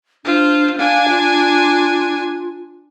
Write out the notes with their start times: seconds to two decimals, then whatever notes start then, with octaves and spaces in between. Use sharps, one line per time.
0.25 D4 F4 C5
0.78 D4 F5 G#5
1.09 F4